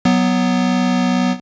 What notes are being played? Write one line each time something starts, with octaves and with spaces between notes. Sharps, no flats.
F#3 B3